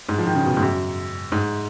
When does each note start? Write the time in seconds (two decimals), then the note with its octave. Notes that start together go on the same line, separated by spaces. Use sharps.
0.09 G#2
0.18 F3
0.26 D#3
0.35 C#3
0.44 B2
0.57 G#2
0.62 F#2
1.32 G#2